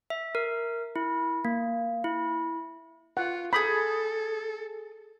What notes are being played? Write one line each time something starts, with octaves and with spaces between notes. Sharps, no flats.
E5
A#4
E4
A#3
E4
F4 F#5
G#4 A4 B5 D#6 G6